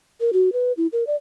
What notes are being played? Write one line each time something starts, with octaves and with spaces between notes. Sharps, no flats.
A#4
F#4
B4
E4
A#4
D5